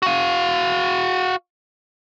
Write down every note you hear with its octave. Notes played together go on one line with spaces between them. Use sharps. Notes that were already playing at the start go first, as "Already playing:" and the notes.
F#4 F5